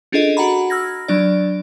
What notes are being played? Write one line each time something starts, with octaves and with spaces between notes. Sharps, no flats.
C#4 D4 F4 G#4 A4 D#5
F#4 F#5 A#5 B5
E6 F6 G#6 A#6
F#3 D4 D5